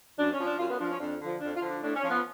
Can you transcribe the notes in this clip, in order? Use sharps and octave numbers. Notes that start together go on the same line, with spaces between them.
F#2 D4
C#4
F3
D4
F#2 F4
B3
F3 D4
C#4
F2 D4
D3 F3
F2 D4
F4
D3 F3
D4
A2 D4
C#4
F3
B3